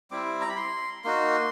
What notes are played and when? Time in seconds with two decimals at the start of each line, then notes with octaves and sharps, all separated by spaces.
0.11 G3 C4 E4 D6
0.41 A#5
0.49 B5
0.57 C6
1.04 A#3 D#4 F#4 C6